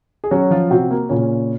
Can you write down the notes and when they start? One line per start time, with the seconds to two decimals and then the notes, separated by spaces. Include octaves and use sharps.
0.24 G#4
0.31 F#3 C#4 F#4
0.51 F3 F4
0.71 C3 C4 F#4
0.91 A#3
1.09 A#2 C#3 C#4